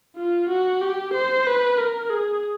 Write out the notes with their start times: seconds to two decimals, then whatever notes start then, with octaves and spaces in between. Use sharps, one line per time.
0.17 F4
0.49 F#4
0.82 G4
1.14 C5
1.47 B4
1.78 A#4
2.10 G#4